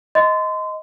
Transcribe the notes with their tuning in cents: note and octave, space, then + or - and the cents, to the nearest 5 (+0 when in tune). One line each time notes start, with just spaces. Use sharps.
D#5 +10 C6 -30